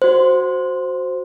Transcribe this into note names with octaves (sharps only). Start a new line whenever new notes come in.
F#4 C5